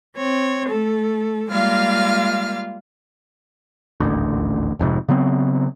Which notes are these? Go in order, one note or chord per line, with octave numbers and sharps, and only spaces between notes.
C4 C#5
A3 A4
G3 G#3 A#3 F4 F5 F6
D#1 A1 D2
F1 F2 G#2 C3
C#3 F#3 B3 C4